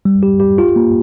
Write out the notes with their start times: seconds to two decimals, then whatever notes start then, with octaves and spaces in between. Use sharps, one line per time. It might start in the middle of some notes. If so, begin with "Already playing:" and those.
0.05 G3
0.23 G4
0.40 G4
0.58 F4
0.76 A#3